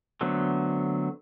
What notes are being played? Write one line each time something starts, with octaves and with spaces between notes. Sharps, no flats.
D3 F#3 A3 B3 C4